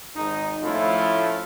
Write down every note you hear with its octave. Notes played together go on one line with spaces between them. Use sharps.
G#1 D#4
A2 F3 A3 C#4 E4 F4